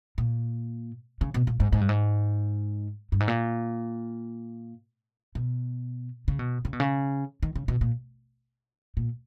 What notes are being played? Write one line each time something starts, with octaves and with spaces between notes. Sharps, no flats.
A#2
C#3
B2
A#2
G#2
G#2
G2
G#2
G2
G#2
A#2
B2
C#3
B2
C#3
B2
C#3
D#3
C#3
B2
A#2
A#2